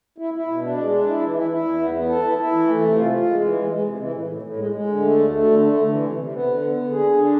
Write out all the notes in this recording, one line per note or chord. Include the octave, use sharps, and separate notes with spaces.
E4
E4
B2
D4
G#3
D4
E4
E3
E4
E4
E2
B3
B3
A4
E4
E4
E3
A3
C3
F4
F4
G#3
E3
G#3
G#3
C3
E3
A2
A2
A2
G#3
G#3
D3
A3
D2
A3
D3
A3
D3
E3
C3
C3
B3
D3
B3
D3
G#4
D3
D4